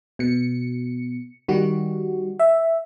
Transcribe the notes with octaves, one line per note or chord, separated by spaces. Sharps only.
B2 C#7
D#3 G3 F#4
E5